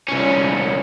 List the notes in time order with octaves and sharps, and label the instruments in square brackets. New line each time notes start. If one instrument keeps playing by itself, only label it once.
[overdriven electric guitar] C2 C#4